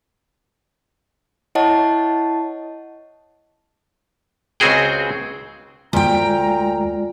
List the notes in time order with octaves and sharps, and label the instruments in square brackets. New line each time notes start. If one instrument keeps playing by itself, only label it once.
[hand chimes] E4 C#5 D#5 F#5 A5
[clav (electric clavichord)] C#2 C#3 C4 F#4 G#4 G5
[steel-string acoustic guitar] D2 G5 [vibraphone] G#3 F4 D5 [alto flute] A#5